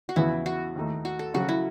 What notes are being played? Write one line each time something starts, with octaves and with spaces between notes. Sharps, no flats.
F#4
E2 C#3 E3 B3 E4
F#4
D#2 D#3 A3 D#4
F#4
A4
C#3 F#3 C#4 F#4
E4